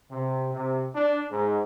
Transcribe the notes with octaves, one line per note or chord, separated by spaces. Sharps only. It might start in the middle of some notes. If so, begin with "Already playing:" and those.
C3
C3
D4
G#2